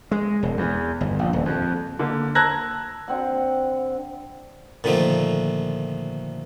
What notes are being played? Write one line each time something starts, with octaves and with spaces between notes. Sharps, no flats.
G#3
E1
E2
G1
A#1
D#1
F2
D3 A#3
A5 A#5 E6 F#6 G#6 A#6
D3 C4 F#5
A#2 D3 D#3 F3 A3